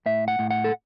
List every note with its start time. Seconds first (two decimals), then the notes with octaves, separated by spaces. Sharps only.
0.06 A2 E5
0.28 F#5
0.39 A2
0.50 F#5
0.64 A4